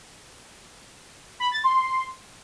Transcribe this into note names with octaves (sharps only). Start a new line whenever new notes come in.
B5
A6
C6